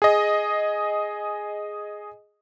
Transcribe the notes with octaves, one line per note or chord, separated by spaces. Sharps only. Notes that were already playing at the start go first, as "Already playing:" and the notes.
G#4 D#5